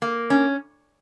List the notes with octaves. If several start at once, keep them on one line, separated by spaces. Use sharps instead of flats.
A#3
C#4